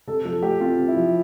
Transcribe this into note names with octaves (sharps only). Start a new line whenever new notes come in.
C3 A4
F3 A4
A3 G4
C4 F4
C3
E4
F3